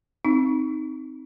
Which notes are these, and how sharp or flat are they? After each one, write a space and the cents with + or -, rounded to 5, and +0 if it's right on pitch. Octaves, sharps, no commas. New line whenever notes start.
C4 +0 D#4 +0